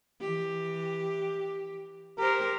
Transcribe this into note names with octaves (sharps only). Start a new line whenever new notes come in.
E3 G4
G4 A#4 C5